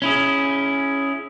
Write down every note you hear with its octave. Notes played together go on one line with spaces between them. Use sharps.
C#4 E4 G#4